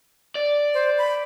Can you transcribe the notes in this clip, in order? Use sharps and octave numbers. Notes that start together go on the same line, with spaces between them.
D5
C5
B5